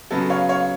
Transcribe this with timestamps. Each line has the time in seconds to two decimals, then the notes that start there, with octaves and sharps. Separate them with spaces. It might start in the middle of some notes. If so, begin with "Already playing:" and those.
0.11 C#3 F#3 B3 A4
0.30 C#5 F5
0.49 C#5 F5